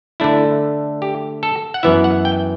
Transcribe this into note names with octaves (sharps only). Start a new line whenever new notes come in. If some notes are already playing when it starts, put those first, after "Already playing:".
D3 A3 D4 E4
G4
A4
F#5
F#2 E3 B3 E4 E5
F#5
G5